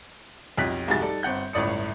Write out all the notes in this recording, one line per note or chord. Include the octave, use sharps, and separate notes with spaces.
B1 F2 G4 F#6 B6
F1 C2 G#2 F#4 G#4 A6
G3 D#4 A4 D5
G1 C4 F#5 G6
G1 C#2 A2 D5 D#6 C#7